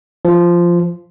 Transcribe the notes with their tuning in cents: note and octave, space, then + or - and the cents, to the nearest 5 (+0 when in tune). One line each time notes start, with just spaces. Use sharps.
F3 -10